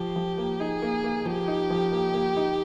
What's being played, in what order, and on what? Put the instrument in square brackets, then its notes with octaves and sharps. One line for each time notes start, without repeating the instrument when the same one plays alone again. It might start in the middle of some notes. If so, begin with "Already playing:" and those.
Already playing: [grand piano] F3 [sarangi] G4
[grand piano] F3
A#3
[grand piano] D#4 [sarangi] G#4
[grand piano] A#3
A#3
[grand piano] F3 [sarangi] G4
[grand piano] D#4
F3
A#3
A#3
D#4